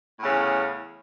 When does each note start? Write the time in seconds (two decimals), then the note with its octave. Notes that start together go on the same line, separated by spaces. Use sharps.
0.18 A2
0.21 E2
0.24 C#3